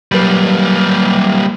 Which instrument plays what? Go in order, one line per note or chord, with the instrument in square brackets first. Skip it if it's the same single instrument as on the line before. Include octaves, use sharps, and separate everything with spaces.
[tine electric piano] F#3 B4 [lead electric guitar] G3 A#3